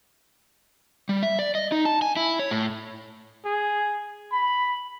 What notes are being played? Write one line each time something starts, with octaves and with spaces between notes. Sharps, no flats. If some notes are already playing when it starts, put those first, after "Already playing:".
G3
E5
D5
D#5
D#4
A5
G#5
E4
C#5
A2
G#4
B5